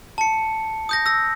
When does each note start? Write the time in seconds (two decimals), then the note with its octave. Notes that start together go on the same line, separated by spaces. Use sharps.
0.18 A5 C#7
0.89 D#6 G6 A#6
1.06 E6 A#6